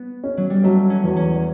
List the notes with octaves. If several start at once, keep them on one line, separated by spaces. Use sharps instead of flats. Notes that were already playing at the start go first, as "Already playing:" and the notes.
Already playing: B3
C#4
F#3
G3
F#3 A3
C#4
E2
C#4